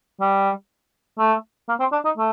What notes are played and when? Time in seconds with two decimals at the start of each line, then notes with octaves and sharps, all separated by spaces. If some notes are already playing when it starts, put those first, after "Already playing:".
0.21 G3
1.19 A3
1.69 A#3
1.80 C4
1.93 D4
2.05 D#4
2.17 A3